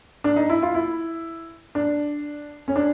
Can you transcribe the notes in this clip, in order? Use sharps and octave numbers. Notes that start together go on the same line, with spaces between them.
D4
D#4
E4
F4
E4
D4
C#4
D4